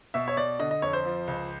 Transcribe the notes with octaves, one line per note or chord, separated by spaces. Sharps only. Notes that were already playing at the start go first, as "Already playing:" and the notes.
B2 E5
C#5
B2 D5
D3 D#5
D#5
F2 C#5
C5
F3
C#2